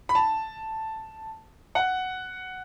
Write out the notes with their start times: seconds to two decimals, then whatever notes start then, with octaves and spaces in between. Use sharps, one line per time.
0.09 B5
0.15 A5
1.75 F#5